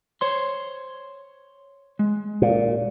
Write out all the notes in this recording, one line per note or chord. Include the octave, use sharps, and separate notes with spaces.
C5 C#5 C6
G#3
A#2